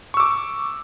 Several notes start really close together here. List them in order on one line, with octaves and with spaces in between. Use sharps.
C#6 E6 D6